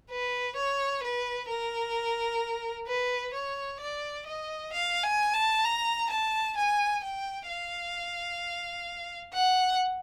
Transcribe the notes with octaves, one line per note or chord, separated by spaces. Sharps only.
B4
C#5
B4
A#4
B4
C#5
D5
D#5
F5
G#5
A5
A#5
A5
G#5
G5
F5
F#5